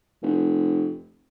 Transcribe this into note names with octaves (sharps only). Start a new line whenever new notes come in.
F1